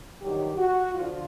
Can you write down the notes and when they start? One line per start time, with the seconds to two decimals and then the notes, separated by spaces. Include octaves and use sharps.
0.21 G2 D#3 F#3 G4
0.57 F#4
0.94 D3 F3 F4